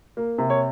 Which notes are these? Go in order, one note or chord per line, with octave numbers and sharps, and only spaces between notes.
A#3
C3
C#5